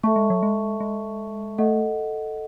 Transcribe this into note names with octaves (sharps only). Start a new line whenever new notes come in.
A3 A4 E5 A5 C#6
G#3
F#3
G#3
G#3
A3 A4 D#5 F#5